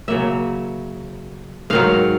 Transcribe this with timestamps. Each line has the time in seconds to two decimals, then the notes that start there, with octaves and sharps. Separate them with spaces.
0.08 C#3 F#3 A#3 E5
1.70 G#2 D#3 F#3 F5